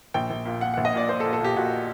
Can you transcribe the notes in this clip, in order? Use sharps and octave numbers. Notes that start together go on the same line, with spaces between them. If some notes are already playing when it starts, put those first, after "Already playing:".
A#1 G5
A#1
A#2
A#2 F#5
F#5
A#1
D#5
A#2 D5
A#2 C5
A4
A#2
A4
A#2 G4
A#2 F#4